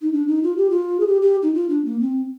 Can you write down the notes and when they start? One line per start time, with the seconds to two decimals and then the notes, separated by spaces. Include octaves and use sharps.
0.02 D#4
0.13 D4
0.27 D#4
0.43 F4
0.57 G4
0.70 F4
1.00 G#4
1.07 G4
1.22 G4
1.43 D#4
1.54 F4
1.69 D4
1.85 A#3
2.01 C4